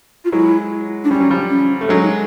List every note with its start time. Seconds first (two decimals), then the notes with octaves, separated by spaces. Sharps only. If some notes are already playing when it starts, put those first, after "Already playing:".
0.25 F4
0.32 F#3 G#3 E4
1.04 D4
1.11 G3 C#4
1.20 F#3
1.30 F3 G3
1.50 C#4
1.81 A3
1.89 F#3 G#3 D4
2.02 D#4